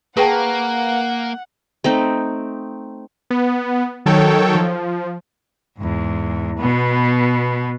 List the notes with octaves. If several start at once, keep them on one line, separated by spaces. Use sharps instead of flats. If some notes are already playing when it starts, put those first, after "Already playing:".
A#3 G#4 B4 F#5 G5 A5 A#5 C#6
A3 C4 D#4
B3
D#3 F#3 A4 C#5 G5
F3
E2 G#2
B2 B3